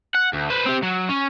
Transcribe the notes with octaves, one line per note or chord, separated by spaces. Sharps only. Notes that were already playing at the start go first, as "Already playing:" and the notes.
F#5
D2
B4 C5
C4 G4
F#3
C#4